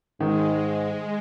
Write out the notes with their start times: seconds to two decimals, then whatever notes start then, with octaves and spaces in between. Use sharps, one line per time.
0.20 G#2 D#3 G#3